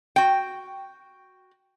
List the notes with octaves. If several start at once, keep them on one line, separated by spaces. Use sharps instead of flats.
F#4 G5